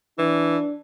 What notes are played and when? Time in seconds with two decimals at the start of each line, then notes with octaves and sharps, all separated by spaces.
0.19 E3 D4